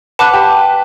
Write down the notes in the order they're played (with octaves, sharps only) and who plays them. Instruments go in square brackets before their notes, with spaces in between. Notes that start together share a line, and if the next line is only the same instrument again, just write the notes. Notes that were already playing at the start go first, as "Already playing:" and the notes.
[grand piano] B4 [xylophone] F#5 A5 D6 F#6
[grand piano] G4